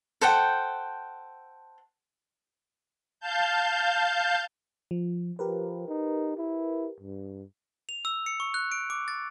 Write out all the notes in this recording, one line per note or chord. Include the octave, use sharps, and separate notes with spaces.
A4 C5 F#5 G5
F5 A5 G6
F3
F3 G4 A#4 B4
D#4
E4
G2
F7
E6
C#7
C#6
F#6
D7
D6
A6